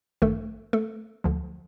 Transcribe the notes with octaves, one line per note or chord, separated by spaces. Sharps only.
A1 G2 D#3 A3 A4
A3 A4
D2 D3 F3